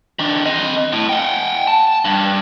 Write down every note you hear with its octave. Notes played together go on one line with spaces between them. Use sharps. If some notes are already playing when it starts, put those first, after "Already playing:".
D#3 D4
C4 D#5
A2
F#5 G5
A5
G2